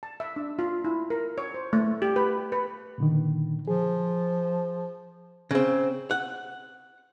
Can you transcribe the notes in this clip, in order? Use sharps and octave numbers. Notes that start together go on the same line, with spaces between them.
A5
E5
D4
F4
E4
A#4
C#5
C5
A3
G4
B4
B4
A#2 D3 D#3
F3 G#4
C#3 C4
F#5